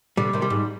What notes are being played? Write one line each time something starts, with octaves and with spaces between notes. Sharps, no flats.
B2 D3 G3
C3 D#3
G3
G#2